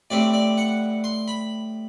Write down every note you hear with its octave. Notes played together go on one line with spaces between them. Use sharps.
A2 G3 C4 D5
D5
F#5
C6
B5